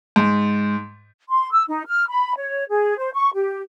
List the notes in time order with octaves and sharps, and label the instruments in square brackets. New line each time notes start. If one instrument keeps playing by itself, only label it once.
[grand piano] G#2
[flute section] C6
E6
D#4
F6
B5
C#5
G#4
C5
C#6
G4